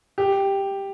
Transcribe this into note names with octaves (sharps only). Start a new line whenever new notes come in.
G4